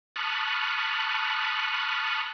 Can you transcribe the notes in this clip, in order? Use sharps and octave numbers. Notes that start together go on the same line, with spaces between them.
A5 B5 C#6 D#6 F6 F#6